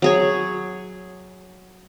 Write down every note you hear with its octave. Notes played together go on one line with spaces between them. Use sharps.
F#3 G#4 C#5